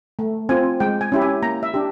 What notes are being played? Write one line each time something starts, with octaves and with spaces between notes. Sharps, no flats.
A3
C4 F4 G#5
G#3 G5
G#5
C#4 E4 G4
G#5
A#3 A#5
E5
D4 G4